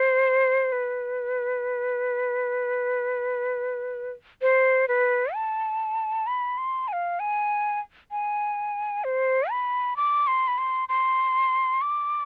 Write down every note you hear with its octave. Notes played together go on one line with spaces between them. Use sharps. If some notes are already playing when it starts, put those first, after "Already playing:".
Already playing: C5
B4
C5
B4
A5
B5
C6
G#5
F5
G#5
G#5
C5
B5
D6
C6
B5
C6
C6
D6